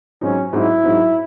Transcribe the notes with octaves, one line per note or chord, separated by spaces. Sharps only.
G#2 F#3 C4 C#4 D#4
G#2 F#3 C4 D#4 E4
G#2 F#3 C4 D#4